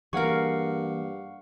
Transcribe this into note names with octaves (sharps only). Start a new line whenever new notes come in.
G2 E3 A#3 G#4 A#4 F5 F#5 C#6